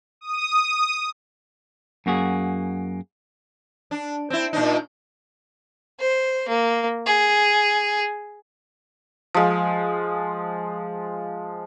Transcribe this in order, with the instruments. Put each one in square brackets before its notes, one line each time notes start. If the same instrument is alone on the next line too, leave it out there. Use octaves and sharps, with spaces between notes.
[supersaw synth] D#6
[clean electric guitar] F#2 A#3 F#4 G#4
[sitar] D4
C4 E4
A#2 D4 D#4
[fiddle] C5
A#3
G#4
[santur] F3 G#3